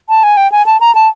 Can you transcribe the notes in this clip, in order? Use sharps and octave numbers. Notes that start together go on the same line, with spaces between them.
A5
G#5
G5
G#5
A5
A#5
A5